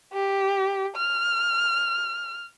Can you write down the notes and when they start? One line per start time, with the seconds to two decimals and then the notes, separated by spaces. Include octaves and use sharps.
0.13 G4
0.96 F6